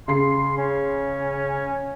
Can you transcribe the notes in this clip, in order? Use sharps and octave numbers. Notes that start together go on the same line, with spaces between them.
C#3 C6 C7
C#4